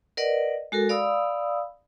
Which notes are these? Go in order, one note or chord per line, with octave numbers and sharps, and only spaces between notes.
A#4 B4 D5 D#5 F#5
G#3 F#4 A4 A#4
D5 F5 B5 D#6 E6